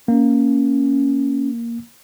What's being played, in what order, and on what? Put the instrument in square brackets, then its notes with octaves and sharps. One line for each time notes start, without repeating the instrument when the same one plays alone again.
[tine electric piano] A#3 [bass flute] C#4